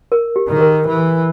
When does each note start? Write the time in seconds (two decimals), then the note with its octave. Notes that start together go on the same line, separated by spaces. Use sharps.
0.12 A#4
0.36 G4
0.48 D#3
0.56 G#4
0.61 A#4
0.87 E3